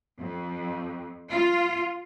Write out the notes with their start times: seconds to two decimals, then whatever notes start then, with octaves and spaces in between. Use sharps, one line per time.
0.19 F2
1.31 F4